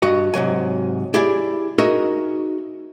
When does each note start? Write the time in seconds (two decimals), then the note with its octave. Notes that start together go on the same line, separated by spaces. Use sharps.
0.02 G2 F#4 D#5
0.34 G#2 C3 F#3 G#5
1.14 E4 G4 G#4 D5 G#5
1.78 D#4 F#4 G#4 A#4 D#5 E5